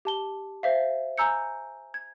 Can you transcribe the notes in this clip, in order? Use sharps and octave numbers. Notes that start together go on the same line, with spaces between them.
G4 A5 G7
C5 E5 F5
G#5 A#5 E6 G6 C#7
G#6